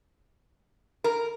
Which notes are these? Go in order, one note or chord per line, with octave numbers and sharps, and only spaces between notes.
A#4